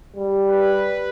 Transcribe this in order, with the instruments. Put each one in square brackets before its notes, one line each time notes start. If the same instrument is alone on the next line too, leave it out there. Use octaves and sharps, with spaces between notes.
[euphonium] G3
[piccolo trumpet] B4